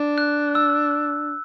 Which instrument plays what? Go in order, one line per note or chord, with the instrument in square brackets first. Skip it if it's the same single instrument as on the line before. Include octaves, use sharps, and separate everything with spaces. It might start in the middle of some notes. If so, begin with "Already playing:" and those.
Already playing: [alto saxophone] D4
[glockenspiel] F#6
E6